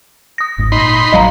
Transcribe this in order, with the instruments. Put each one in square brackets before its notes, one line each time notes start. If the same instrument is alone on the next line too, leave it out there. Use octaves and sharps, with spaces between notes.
[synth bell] D#6 A#6
[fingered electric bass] G1 G#2
[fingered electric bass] A#2 [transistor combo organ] D#4 B5 C6
[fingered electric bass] A1 F#3 G#3 [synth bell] D#5 F5 A#5